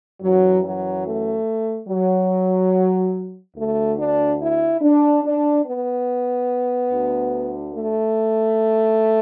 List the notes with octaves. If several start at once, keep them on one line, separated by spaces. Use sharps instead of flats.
F#2 E3 F#3
F#3
A3
F#3
D2 D3 A3
D4
E4
D4
D4
B3
D2 D3
A3